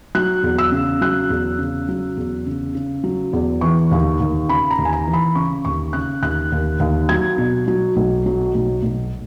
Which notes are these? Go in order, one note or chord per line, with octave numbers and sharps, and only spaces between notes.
F#3 F#6
E2
E6
C#3
F#3 F#6
E2
C#3
F#3
E2
C#3
C#3
F#3
E2
E3 C#6
D#2
D#2
C#3 B5
A#5
D#2
G#5
A#5
E3
B5
C#3 C#6
D#2 C#6
C#3 F#6
D#2 F#6
D#2
D#2
F#3 G#6
B2
F#3
B1
F#3
B1
B1